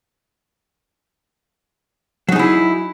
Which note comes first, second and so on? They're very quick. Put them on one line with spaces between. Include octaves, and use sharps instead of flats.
F#3 D#4 G#4 E4